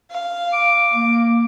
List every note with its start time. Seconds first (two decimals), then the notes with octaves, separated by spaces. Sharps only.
0.10 F5
0.53 D6
0.94 A#3